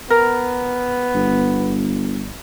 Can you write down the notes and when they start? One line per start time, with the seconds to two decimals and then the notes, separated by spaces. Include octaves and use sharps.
0.10 B3 A#4
1.15 G1